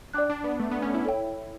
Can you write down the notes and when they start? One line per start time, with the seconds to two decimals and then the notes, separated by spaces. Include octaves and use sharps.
0.14 D4 D5 G5 D6 F#6
0.30 D4
0.44 B3
0.60 A3
0.71 B3
0.82 C#4
0.94 E4
1.05 E4 A4 C#5 G5